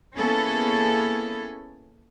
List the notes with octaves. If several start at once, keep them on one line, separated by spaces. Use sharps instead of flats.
A#3 B3 C#4 E4 G#4 A4